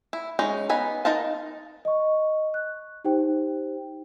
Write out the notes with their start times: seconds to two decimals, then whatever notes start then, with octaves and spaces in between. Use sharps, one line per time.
0.13 E4
0.39 G#3 C#4 D#4
0.69 B3 D#4 G#5 B5
1.05 D#4 A#4 D#5 F5 A5
1.85 D#5 C#6
2.54 F#6
3.05 D#4 G4 C5 G5